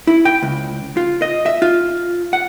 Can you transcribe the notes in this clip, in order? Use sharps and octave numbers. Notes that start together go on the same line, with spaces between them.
E4
G5
C#2
F4
D#5
E5
F4
F#5